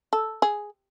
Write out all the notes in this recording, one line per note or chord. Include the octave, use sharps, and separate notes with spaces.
A4
G#4